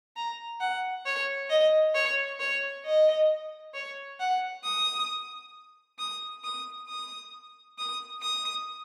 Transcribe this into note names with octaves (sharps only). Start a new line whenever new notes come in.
A#5
F#5
C#5
D#5
C#5
C#5
D#5
C#5
F#5
D#6
D#6
D#6
D#6
D#6
D#6